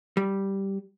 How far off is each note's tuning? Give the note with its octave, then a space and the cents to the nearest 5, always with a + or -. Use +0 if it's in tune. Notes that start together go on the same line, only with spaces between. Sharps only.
G3 -5